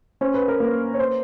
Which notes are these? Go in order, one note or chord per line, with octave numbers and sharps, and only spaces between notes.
C#4 C5
B4
A#4
A#3 B4
C#5
C5